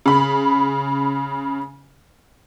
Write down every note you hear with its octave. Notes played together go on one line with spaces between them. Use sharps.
C#3 B5